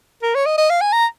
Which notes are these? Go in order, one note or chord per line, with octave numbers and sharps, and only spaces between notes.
A#4
C#5
D#5
D#5
F5
G#5
A#5